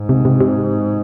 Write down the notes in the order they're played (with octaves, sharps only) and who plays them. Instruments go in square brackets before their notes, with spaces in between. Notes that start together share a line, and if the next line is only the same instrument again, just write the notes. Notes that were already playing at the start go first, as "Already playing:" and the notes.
Already playing: [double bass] G#2
[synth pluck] C3
C3
C3